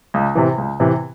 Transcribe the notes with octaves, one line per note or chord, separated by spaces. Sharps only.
C#2
C3 E3
C#2
C3 E3